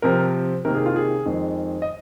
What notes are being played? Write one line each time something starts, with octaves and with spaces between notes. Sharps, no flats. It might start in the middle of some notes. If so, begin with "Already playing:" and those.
C3 F3 C4 A#4
C3 D#3 A#3 A#4
G#4
F4
G#4
F2 D#3 G#3 C4
D#5